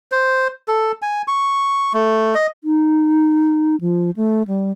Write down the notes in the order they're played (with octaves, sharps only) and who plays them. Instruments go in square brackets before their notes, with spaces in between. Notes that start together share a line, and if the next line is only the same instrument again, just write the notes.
[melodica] C5
A4
G#5
C#6
A3
D#5
[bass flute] D#4
F3
A3
G3